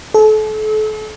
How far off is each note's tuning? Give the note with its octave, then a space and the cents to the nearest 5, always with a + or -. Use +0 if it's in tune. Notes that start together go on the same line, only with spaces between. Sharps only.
A4 -35